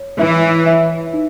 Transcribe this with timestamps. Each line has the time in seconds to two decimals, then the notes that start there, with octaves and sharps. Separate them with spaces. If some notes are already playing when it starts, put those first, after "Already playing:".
Already playing: C#5
0.19 E3 E5
0.66 E5
1.13 D#4